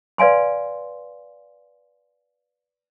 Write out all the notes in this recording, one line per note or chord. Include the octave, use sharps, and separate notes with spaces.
B4 D5 F5 G#5 C6